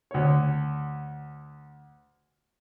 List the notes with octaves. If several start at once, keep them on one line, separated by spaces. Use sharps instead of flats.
D2 C#5